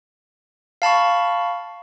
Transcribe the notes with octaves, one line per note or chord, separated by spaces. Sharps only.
F5 A5 B5 C#6